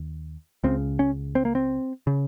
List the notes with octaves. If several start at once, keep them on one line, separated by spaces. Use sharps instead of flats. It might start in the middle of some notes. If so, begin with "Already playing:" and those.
Already playing: D#2
C#2 C#3 C4
C#4
C4
A#3
C4
C#3